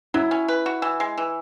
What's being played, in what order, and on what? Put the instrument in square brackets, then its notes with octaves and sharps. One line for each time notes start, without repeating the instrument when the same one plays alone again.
[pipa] F#3 [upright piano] E4
[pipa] C#4
B4
F#4
E3
G#3
E3